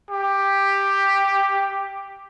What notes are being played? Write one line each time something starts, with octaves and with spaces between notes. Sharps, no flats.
G4